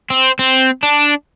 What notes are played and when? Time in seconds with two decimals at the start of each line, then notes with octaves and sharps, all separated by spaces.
0.10 C4
0.39 C4
0.83 D4